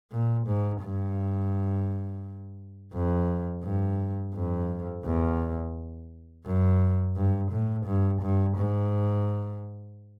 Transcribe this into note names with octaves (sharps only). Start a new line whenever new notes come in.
A#2
G#2
G2
F2
G2
F2
E2
F#2
G2
A2
G2
G2
G#2